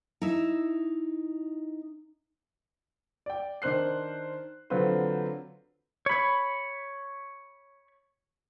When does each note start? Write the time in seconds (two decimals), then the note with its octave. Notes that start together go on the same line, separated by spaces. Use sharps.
0.22 D#4 E4 E5
3.26 D5 G5
3.62 D#3 D4 C5 F#6 C7
4.70 D3 F#3 C4 F4 B4 C5
6.06 C#5 B5